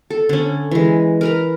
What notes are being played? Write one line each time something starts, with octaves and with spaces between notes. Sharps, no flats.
A4
D3 C#4
E3 G#3
A#4 B4 A#5